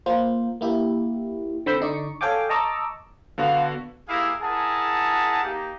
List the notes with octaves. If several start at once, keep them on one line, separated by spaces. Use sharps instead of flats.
A#3 F4 C5
A#3 E4 G4
D3 C4 B5 E6 G6
D3 D#4 D5 C#6
A4 C#5 F5 G5 G#5 D6
D#5 A5 A#5 C#6 D6 E6
D3 B3 F#4 F5
A#3 E4 G4 G#4 A#4 F5
E4 G#4 A#4 F#5 A5
A#3 D#4 G4